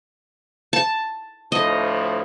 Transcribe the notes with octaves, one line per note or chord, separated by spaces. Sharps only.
A5
D2 A2 F3 D#5